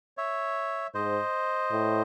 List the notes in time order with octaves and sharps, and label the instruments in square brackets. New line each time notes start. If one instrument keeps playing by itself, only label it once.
[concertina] C#5 E5
[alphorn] G#2 [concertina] C5 D#5
[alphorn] A2